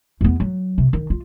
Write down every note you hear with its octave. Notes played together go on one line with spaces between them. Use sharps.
E2 B3
F#3
C3
D#3
F4